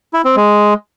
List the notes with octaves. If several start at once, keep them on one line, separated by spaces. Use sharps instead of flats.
E4
C4
G#3